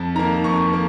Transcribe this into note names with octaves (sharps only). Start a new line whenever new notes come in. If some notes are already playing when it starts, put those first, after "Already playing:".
Already playing: F2 A5
D#3 A#3 A#5
F2 C#6
A#3